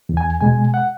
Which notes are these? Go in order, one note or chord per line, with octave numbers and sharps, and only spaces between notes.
E2
G#5
B2 G#3 G#5
F#5